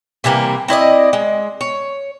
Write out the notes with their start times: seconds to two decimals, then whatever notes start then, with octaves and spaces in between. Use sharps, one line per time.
0.24 C3 E3 G3 A#3
0.68 C4 E4 D5 D#5
1.13 G#3
1.61 C#5